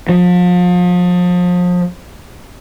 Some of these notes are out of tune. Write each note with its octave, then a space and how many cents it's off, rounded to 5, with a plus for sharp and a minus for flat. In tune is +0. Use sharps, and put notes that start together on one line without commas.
F3 +35